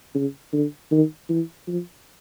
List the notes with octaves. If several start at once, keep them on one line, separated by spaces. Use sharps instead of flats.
C#3
D3
D#3
E3
F3